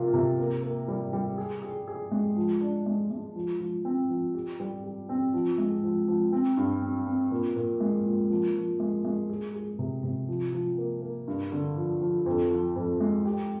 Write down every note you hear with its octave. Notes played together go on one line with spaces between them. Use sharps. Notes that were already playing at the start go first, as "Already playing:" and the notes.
Already playing: C3 A#3 F4
C3
A#3
A#3
G3
G3
G#4
G#4
G#4
G#3
F3
D4
G#3
G#3
F3
F3
C4
F3
G4
G3
G4
C4
F3
G#3
F3
F3
C4
G2
C4
C4
A#2
A#2
G#3
A#2
F3
F3
G#3
G#3
G#4
G#4
C3
C3
F3
F3
A#3
A#3
G2
D3
F3
F3
F2
F3
F2
G#3
G4